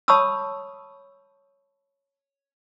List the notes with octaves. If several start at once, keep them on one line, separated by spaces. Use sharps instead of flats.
C#5 A5 B5 C#6 D#6 E6